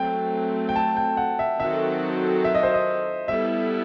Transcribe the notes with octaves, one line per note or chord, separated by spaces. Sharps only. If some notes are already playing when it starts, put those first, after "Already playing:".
Already playing: F#3 A3 C4 G5
G5
A5
G5
F#5
E5
D#3 F#3 C4 F#4 A4 E5
E5
D#5
C5
D#5
G3 B3 E4 A4 E5